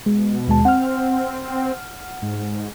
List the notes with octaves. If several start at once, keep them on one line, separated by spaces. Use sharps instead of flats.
B2 G#3
D#2 G#3 A5
C4 F#5 F6
G#2